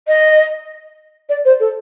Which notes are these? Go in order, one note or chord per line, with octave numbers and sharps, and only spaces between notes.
D#5
D5
C5
A4